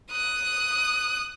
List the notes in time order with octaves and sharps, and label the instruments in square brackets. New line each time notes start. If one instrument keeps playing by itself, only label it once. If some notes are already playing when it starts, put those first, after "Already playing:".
[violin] D#6 F#6